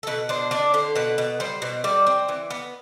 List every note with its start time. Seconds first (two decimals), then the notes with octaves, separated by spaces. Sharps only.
0.03 A4
0.07 B2 B4
0.29 D4 C5
0.51 D4 D5
0.74 D3 C5
0.96 B2 B4
1.18 B2
1.40 G3 C5
1.62 B2
1.84 G3 D5
2.07 C4
2.29 E3
2.50 B3